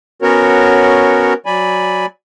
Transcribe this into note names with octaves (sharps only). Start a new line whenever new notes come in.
B3 C#4 F#4 A#4 C#5
F#3 D5 G#5 B5